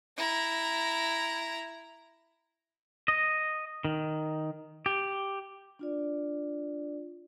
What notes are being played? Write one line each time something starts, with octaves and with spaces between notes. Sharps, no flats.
E4 A#5
D#5
D#3
G4
D4 F4 D5